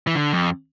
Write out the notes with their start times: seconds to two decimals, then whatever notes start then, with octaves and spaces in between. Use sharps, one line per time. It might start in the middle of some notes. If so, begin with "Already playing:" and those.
0.07 E3
0.15 D3
0.32 F2